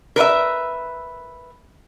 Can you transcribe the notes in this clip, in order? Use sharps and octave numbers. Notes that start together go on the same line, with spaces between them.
A#4 B4 D#5 E5